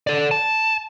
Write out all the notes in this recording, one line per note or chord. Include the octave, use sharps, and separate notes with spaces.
A4 D5
A5